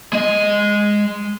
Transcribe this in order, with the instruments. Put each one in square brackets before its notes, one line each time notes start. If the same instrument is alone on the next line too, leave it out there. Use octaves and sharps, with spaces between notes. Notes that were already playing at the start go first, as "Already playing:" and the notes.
[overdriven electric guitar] G#3 D#5